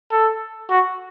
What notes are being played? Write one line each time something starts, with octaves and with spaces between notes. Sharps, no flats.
A4
F#4